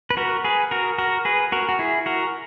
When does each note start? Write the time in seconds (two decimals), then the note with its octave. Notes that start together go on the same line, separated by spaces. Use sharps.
0.10 B4
0.17 F#4 A#4
0.44 G#4 B4
0.71 F#4 A#4
0.98 F#4 A#4
1.25 G#4 B4
1.52 F#4 A#4
1.69 F#4
1.79 E4 G#4
2.06 F#4 A#4